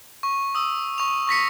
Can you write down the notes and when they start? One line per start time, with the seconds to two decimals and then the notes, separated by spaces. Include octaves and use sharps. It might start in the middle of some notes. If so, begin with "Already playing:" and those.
0.23 C#6
0.55 D#6 E6
0.98 C#6 F7
1.27 C#6 A#6 B6 C#7